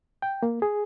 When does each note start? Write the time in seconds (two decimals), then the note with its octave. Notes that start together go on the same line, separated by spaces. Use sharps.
0.22 G5
0.43 A#3
0.62 G#4